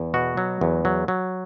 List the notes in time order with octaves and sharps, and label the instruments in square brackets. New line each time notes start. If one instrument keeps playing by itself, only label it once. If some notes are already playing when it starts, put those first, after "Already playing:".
Already playing: [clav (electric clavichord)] E2
B2 F#4
F#3
E2
F#3
F#3